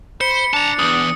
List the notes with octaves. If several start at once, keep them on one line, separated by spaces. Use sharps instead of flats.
C5 B5 C#7
D4 A5 A#5
B1 E2 D#6